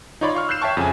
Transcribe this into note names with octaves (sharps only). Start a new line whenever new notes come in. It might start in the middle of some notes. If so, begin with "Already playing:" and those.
D#4 F4 C#5 D5 B5 C6
F5 C#6 F6
E6 F#6 G6 C7 E7
C#5 E5 G5 A5 C#6
F2 C#3 G#5